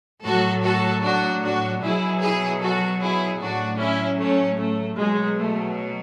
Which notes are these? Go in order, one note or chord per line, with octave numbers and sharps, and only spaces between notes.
A2 F#3 F#4 A4
F#4 A4
D4 F#4
D4 F#4
B2 F#3 E4 G#4
E4 G#4
F#4 A4
E4 G#4
A2 F#3 D4 F#4
C#4 E4
A3 C#4
A3
B2 F#3 G#3
A3